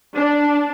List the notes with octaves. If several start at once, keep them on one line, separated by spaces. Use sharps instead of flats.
D4